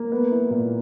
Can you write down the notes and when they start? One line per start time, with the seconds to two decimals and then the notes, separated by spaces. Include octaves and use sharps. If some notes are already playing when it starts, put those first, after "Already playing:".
Already playing: A#3
0.12 B3
0.31 E4
0.51 A#2